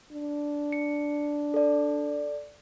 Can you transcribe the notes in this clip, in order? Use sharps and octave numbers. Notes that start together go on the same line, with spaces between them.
D4
C#7
A4 D5